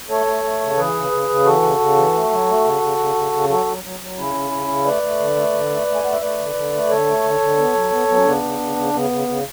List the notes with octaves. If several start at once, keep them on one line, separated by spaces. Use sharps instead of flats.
A3 A4 C#5
A3
A3
C#3
E3 G#4 B4
C#3
C#3
C#3
E3 F#4 A4
C#3
C#3
E3
A3
F#3
A3
C#3
C#3
C#3
C#3
C#3
F#3 F#4 A4
F#3
F#3
F#3
C#3 C#4 E4
C#3
C#3
C#3
A3 B4 D5
A3
D3
A3
D3
A3
A3
G#5
A3 F#5
E5
A3 B4 D5
D3
D3
A3
D3 A4 C#5
A3
D3
D3
B3
F#3
B3
F#3 B3
C#4
C#3 B3 D4
C#3
C#3
C#3
C#3 B3
C#3
C#3